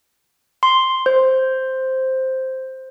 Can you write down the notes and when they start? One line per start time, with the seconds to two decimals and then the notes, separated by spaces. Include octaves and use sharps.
0.63 C6
1.06 C5